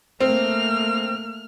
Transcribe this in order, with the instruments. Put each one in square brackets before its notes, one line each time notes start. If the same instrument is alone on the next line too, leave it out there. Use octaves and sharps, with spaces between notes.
[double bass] A3 A#3 [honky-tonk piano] C4 [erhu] F6